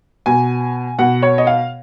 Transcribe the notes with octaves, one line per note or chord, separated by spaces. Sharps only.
B2 G#5
B2 F#5
C#5
D#5
F5